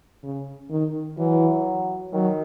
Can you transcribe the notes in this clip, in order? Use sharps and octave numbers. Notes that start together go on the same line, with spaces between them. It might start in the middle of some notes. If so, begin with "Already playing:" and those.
C#3
D#3
E3 F#3
D#3 F#3